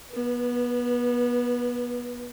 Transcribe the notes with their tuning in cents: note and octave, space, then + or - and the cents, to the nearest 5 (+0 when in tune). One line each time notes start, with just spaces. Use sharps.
B3 -25 B4 +0